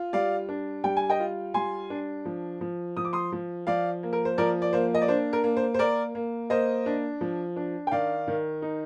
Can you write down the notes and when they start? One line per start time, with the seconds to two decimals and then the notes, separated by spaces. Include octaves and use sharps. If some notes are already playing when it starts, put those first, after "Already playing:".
Already playing: F4
0.13 G3 D5 F5
0.49 D4
0.84 G3 G5
0.97 G#5
1.10 D#5 G5
1.20 F4
1.54 G3 G#5 C6
1.90 D4
2.25 F3
2.61 F3
2.97 F3 D#6
3.05 D6
3.13 C6 D#6
3.32 F3
3.67 F3 D5 F5
4.03 A#3
4.13 A#4
4.25 C5
4.38 F3 A#4 D5
4.62 D5
4.73 A#3 C5
4.94 D#5
5.02 D5
5.08 D4 C5
5.33 A#4
5.44 A#3
5.57 C5
5.74 C5
5.79 A#3 A#4 D5
6.15 A#3
6.50 A#3 C5 D#5
6.86 D4
7.21 F3
7.56 D4
7.87 G5
7.92 D#3 D5 F5
8.28 D#3
8.62 D#4